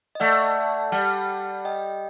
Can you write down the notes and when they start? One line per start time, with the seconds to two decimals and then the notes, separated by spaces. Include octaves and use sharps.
0.15 D#5
0.20 A3 D5 F#5
0.92 G3 F#5 A5
1.65 D#5 G5